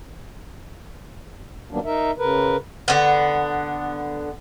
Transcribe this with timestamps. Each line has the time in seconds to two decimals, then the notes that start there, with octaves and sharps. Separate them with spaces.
1.71 D#3 F#3 G3 A#3 B3 D4
1.84 D#4 A#4 E5
2.18 C#3 A#4 B4
2.88 D3 B3